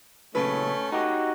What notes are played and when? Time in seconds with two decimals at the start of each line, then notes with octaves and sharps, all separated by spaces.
0.35 A#2 C#3 F#3 A3 C#4 B4
0.92 D#4 F#4 G4